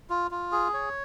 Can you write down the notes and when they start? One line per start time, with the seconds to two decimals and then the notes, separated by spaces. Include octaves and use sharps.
0.10 F4
0.31 F4
0.52 G#4
0.74 C#5